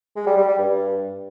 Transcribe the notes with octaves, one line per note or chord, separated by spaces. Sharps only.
G#3
G3
G3
G3
G2